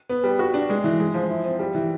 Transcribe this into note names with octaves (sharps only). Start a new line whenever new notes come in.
B3
G3
F#4
D4
G#3
E3
G#3
F3
E4
C4
G3
E3